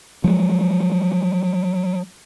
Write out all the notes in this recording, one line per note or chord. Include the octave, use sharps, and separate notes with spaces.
F3 F#3 G#3